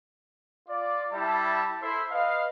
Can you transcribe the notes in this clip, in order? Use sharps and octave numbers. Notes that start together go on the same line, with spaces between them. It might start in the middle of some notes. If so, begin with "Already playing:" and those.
F4 D5
G3 E4 E5 A5
E4 A4 C5 E5 C6
B4 D#5 F5